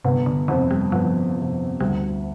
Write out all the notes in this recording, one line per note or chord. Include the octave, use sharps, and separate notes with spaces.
G1 C3
D3
F2 C3 D#3
G3
G1 F3
F2 C3
D2 G3